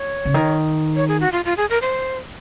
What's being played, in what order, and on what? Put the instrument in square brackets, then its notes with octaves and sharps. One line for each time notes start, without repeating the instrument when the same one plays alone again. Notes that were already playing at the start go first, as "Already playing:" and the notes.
Already playing: [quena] C#5
[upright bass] C#3
D#3
[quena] C#5
G#4
F#4
F4
F4
G#4
A#4
C5